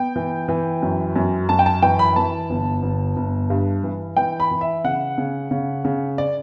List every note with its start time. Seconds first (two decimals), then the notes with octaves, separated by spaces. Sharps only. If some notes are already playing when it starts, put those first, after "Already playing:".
Already playing: B3 G5
0.16 E3
0.48 E3
0.82 F#2
1.16 F#2
1.49 F#2 A5
1.59 G5
1.66 A5
1.82 E3 G5
1.99 B5
2.16 E3 A5
2.50 G1
2.83 G1
3.17 G1
3.50 G2
3.84 E3
4.17 E3 G5
4.40 B5
4.51 E3
4.61 E5
4.84 C#3 F#5
5.18 C#3
5.51 C#3
5.85 C#3
6.18 D5